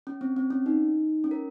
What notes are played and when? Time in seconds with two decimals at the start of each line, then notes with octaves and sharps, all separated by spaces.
0.07 C#4
0.21 C4
0.36 C4
0.50 C#4
0.66 D#4
1.24 C#4
1.31 A#4